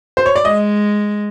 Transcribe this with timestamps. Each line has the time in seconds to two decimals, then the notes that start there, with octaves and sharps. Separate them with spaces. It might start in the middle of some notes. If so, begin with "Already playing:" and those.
0.17 C5
0.26 C#5
0.36 D5
0.45 G#3 D#5